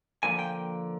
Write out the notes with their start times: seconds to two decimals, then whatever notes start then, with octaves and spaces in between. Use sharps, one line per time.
0.23 D3 F3 A#3 G#5
0.39 G5